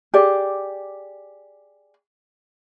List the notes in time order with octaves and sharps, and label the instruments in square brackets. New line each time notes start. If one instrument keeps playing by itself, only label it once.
[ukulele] G4 G#4 D5